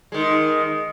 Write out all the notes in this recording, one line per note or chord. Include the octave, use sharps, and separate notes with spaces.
D#3 G#3